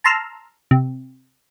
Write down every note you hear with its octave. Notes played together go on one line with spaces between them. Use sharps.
A5 A#5 C6 E6 F6
C3